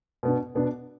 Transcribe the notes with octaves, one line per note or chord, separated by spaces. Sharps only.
B2 B3 D4
B2 B3 D4